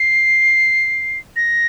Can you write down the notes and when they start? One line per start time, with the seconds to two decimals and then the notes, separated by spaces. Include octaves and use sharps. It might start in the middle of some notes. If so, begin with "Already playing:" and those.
Already playing: C7
1.36 A#6